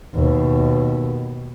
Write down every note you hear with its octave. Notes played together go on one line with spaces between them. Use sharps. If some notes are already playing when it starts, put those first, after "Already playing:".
D#2 B2